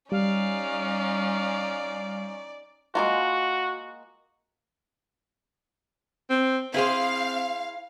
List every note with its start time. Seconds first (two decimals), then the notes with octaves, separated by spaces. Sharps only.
0.12 G3 C#4 D#4 D5 F5
2.95 G#3 A#3 F4 F#4
6.30 C4
6.74 C4 E4 G#4 C5 F5